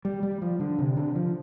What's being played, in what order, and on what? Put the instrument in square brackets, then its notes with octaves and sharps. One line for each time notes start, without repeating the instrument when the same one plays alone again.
[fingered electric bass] G3
G3
F3
D3
C3
D3
F3